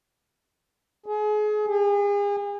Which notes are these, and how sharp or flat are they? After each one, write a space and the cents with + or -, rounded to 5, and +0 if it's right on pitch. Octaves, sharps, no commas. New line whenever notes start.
G#4 +30
G#4 -40